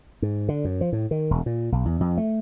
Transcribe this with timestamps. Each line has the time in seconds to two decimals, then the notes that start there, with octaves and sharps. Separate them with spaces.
0.22 G#2
0.49 D3
0.65 F#2
0.81 F3
0.93 A2
1.11 D#3
1.31 E1
1.46 A#2
1.72 B1
1.85 E2
2.00 F2
2.17 A3